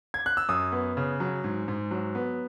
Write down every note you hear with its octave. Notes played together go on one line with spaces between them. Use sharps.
G#6
F#6
E6
F#2 D#6
B3
C#3
F#3
G#2
G#2
F#3
B3